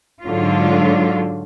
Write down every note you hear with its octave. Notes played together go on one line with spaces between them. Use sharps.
G#2 D3 F#3 F4